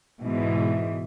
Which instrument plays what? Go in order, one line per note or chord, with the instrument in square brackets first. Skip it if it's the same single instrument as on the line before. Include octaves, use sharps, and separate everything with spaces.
[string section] G#2 B2 E3